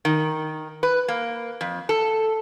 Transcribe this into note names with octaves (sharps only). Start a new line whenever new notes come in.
D#3
B4
A#3
F2
A4